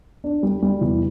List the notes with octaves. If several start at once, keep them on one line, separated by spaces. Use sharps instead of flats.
D4
G3
G3
E2